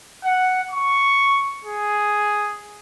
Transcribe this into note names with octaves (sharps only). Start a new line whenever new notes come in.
F#5
C#6
G#4